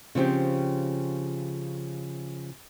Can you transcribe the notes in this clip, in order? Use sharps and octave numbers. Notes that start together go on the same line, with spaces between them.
C#3 F3 C4 G4